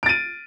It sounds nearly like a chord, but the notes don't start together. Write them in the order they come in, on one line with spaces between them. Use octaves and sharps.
D7 A6 D#7